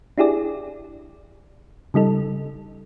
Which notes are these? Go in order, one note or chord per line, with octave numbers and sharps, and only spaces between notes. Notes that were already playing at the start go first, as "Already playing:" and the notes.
D4 E4 G4 G#4 D5
C#3 G3 D#4 A4